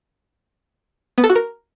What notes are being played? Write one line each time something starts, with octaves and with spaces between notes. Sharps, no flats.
B3
A4
F#4
A#4